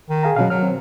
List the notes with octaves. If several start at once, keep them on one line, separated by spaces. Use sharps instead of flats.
D#3
G#4 F5 A#5
B2 F#3 C#4 F5
F#3 F6
C4